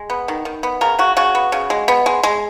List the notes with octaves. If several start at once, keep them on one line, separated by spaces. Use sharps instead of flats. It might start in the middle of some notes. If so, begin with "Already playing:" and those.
Already playing: G#3
B3
D#3
D#3
B3
C#3 A#4
C#3 F#4
C#3 F#4
B3
C#3
G#3
B3
G#3
G#3